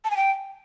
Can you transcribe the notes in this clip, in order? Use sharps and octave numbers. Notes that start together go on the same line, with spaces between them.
A5
G#5
G5